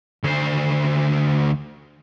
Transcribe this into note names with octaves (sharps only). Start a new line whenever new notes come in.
D2 C5